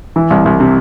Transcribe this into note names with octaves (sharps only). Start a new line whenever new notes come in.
E3
C2
C2
C3